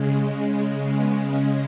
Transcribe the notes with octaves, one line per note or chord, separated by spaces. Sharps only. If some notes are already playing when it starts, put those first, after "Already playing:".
Already playing: C#3 G#3
B3
C#4